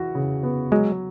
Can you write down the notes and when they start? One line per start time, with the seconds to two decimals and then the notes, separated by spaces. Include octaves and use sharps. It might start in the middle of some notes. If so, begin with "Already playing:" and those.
Already playing: E3 F#4
0.15 C#3
0.43 B3
0.71 F#3 G#3